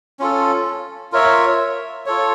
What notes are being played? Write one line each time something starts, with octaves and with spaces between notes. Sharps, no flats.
C#4 F4 A4
F4 A#4 C#5 E5
F4 A4 C#5